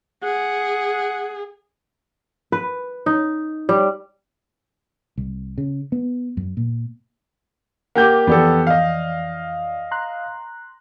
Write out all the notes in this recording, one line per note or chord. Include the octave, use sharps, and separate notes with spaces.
G#4 F#5
B4
D#4
G3
C2
C#3
B3
F#2
A#2
A#3 G4 F#5 G6
F2 E3 B3 G4 A4 D5
D#5 F5
A#5 C6 F#6